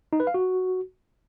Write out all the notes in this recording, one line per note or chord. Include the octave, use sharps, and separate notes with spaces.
D#4
B4
F5
F#4